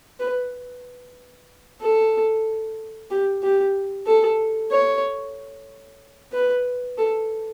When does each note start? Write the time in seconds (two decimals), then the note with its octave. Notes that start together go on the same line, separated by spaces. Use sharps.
0.20 B4
1.82 A4
3.11 G4
3.43 G4
4.07 A4
4.72 C#5
6.32 B4
6.98 A4